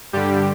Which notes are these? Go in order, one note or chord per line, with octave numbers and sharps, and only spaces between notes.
G2 D3 G3 G4